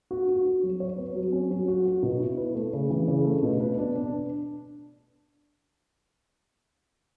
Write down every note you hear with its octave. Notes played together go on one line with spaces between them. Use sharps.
F#4
F#4
F#4
F#3
C#5
B3
F#3
C#4
F#3
F#4
F#4
B2
E4
B4
A3
C#3
E3
C#3
A3
B2
B4
D4
D4